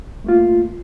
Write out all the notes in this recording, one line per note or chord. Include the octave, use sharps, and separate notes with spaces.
A3 A#3 F4